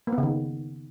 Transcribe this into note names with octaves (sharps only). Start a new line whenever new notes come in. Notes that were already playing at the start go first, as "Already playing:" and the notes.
A#3
B3
C#3
D#3